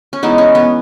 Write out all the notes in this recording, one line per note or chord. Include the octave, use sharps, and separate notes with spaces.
C#4
E3 G#3 B3 D#4
C#4
B3